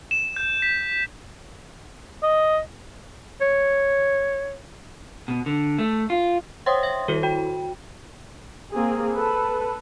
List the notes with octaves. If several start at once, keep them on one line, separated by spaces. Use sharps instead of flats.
E7
G6
B6
D#5
C#5
B2
D3
A3
F4
C5 C#5 F#5 G5 C6 D#6
E5 A#6
D#3 E4 F#4 A4
F#4 G5
A#3 C4 G#4
A4 B4